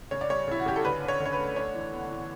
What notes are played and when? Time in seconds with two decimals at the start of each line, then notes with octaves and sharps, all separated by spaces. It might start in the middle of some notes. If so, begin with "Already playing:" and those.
0.11 C#3 C#5
0.21 D5
0.30 G3 C#5
0.48 C#3 E4
0.60 F#4
0.66 C#3 G4
0.76 A4
0.84 D3 B4
1.02 D4
1.08 C#5
1.20 D3
1.26 C#5
1.33 B4
1.38 A3
1.56 D4 C#5
1.75 E3
1.93 B3
2.11 E3